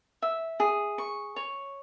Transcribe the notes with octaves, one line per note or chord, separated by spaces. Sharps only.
E5
G#4
C#6
C#5